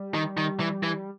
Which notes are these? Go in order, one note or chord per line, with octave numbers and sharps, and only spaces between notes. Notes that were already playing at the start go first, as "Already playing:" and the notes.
Already playing: G3
D#3
D#3
E3
E3